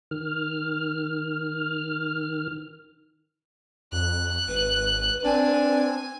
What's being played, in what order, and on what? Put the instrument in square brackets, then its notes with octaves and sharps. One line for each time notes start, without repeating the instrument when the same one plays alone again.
[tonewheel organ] D#3 F6
[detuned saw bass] F2 [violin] F#6
[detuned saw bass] G#1 [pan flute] B4
[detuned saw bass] C4 [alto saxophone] D4 [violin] G#5